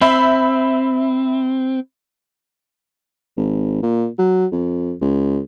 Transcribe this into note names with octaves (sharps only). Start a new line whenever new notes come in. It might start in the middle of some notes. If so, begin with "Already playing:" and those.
C4 E5 B5
G#1
A#2
F#3
F2
C#2